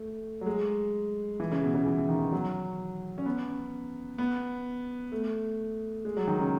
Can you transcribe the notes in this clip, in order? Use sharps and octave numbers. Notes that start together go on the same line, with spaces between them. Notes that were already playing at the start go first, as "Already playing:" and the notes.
Already playing: A3
F#3
G#3
E3
C#3
B2
C#3
E3
E3
D#3
E3
F#3
C#4
B3
B3
A3
G#3
F#3
D#3
C#3